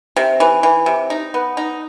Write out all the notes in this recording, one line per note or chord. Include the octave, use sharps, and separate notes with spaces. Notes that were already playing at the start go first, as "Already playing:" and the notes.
C3
E3
E3
C3
D#4
B3
D#4